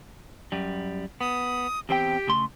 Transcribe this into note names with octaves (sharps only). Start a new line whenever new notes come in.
F#2 G3
B3 D#6
E2 C4 G4 G5
C#3 A3 C6